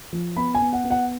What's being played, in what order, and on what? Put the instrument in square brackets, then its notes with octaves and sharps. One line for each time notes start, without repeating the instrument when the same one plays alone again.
[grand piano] F3
B3 B5
G#5
B3
F#5
B3
F#5